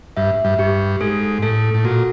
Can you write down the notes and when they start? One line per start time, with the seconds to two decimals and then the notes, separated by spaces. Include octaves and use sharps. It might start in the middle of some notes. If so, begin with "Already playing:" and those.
0.17 G2 E5
0.45 G2
0.59 G2 G4
1.01 G#2 A4
1.42 A2 A4
1.74 A2
1.84 A#2 F#4